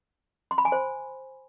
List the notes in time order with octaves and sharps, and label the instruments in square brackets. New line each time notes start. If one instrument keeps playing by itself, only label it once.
[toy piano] C6
B5
G#5
C5